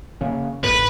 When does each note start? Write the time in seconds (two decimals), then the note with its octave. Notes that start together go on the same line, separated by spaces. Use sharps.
0.21 C#3 A#3 C#4
0.64 A1 D2 G#2 B4